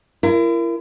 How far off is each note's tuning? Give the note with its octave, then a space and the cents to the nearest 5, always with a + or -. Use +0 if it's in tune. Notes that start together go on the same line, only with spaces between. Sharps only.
E4 +40 A#4 +0